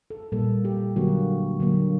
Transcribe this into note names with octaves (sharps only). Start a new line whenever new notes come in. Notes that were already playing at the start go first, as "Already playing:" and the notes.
A4
A#2 G3 A#3 A4
G4
D3 F#3 A#3 F#4
D3 F#3 A#3